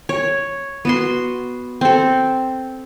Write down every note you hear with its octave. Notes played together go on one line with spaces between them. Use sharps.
C#5
B3 F#4 C6
C4 A4